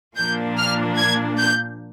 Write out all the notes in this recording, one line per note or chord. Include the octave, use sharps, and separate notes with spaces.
A#2 F3 A#3 D4 G6
F6
G#6
G6